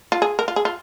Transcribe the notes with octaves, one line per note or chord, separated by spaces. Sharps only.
F4
G#4
A#4
F4
G#4
F4